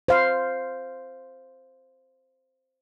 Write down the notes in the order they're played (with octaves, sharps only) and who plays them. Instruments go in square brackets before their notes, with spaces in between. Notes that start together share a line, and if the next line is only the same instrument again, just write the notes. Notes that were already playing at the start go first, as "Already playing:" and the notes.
[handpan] C5 F5